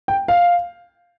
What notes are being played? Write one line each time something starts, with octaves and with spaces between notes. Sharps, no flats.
G5
F5